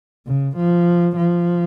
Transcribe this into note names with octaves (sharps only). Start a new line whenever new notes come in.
C#3
F3
F3